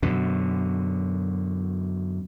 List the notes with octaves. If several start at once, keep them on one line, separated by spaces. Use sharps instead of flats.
F#2 B2 D3